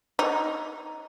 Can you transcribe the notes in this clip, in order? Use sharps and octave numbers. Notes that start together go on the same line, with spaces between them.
D#4